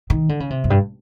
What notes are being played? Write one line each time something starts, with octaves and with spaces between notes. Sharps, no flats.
D#3
D3
C#3
C3
F#2
G2